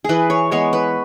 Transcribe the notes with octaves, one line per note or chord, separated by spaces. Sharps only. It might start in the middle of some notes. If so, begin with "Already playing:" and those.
E3 G#4 B4
C#5
G#3 B3 C#5
B4